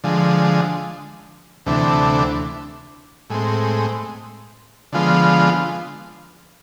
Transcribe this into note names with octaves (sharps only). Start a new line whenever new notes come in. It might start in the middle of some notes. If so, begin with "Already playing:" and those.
D3 F3 G#3
D2 C3 E3 A3 D4
A2 G#3 C4
D3 F3 G#3 B3 F4